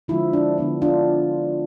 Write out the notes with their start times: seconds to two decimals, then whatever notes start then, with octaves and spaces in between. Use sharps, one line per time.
0.08 D3 F3 G#3 E4
0.33 D4
0.58 D3 F3 B3 D4
0.82 D4 F4